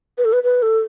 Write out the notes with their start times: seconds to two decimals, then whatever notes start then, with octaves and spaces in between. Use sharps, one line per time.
0.18 B4
0.25 A4
0.33 B4
0.44 B4
0.62 A4